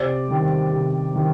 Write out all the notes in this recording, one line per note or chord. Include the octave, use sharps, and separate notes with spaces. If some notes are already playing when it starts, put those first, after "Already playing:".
Already playing: C3 C5 D5
D#3 G3
C3
D#3 G3